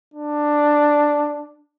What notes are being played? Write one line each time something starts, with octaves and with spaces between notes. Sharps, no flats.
D4